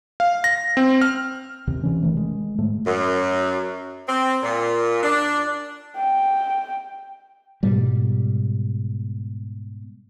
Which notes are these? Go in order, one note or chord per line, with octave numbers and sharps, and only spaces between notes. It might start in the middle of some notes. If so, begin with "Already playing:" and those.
F5
A#6
C4
F6
D#2 C3 D#3
C3 E3 C#4
F#1 D#3 E3 A3
D#3 G#3
G#2 A3
F#2
C4
A#2
D4
G5
G#2 B2 G3